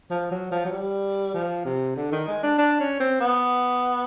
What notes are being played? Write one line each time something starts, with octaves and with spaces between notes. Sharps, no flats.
F3
F#3
F3
F#3
G3
F3
C3
D3
D#3
G#3
D4
D4
C#4
C4
B3